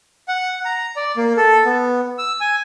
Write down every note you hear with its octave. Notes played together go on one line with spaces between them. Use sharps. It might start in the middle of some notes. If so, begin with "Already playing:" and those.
F#5
A#5
D5
A#3
A4
B3
E6
G#5